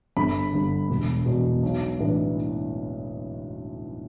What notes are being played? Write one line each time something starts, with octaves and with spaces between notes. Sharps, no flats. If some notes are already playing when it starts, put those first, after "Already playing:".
G1 B5
G2 D3
E1
E2 B2
B1
A2 E3 B3 D4